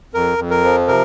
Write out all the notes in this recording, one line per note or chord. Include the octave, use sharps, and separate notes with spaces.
F2 A#4
F2
A#4
F3
C3 A#4